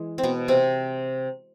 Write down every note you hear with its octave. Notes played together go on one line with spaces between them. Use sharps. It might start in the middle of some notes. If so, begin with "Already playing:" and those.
Already playing: E3 G#3
C4
B2 B3
C3 C4